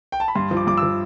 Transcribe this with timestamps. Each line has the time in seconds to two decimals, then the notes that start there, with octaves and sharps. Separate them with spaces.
0.12 G5
0.20 A5
0.28 B5
0.35 G2 C6
0.51 F3
0.57 D6
0.67 G2 D6
0.77 E6
0.83 F3